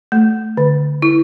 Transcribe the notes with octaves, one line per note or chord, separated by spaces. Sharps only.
A3
D3
E4